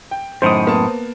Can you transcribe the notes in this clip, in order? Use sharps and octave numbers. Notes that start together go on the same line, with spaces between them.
G5
F#2 A2 D#3 C5 D#6
A#3 B3 A5